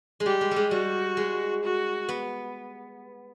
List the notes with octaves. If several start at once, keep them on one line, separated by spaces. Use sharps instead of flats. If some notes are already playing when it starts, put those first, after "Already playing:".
G#3
G3 G4
G#3
G3 G#3
G3 F#4
G#3
F#4
B3